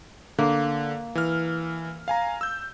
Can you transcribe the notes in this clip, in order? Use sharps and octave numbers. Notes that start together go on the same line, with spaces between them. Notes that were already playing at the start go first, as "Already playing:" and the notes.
D3 A#3
E3 F6
F5 G#5 A#5
E6 G6